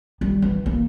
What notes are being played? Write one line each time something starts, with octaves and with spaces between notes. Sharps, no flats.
G3
E3
A#3